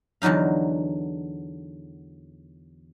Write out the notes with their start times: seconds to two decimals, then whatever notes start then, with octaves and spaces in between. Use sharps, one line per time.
0.22 E2 D3 F#3 D#4 F5